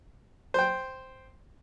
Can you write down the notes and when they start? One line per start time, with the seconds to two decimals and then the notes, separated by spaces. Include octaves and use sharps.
0.54 C5 G5